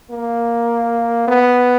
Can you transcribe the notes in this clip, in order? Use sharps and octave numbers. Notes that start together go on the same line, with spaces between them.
A#3
B3